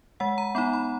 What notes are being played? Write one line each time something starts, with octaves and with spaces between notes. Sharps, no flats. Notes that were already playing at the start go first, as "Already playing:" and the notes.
G#3 F#5
A#5
B3 D#4 B5
B5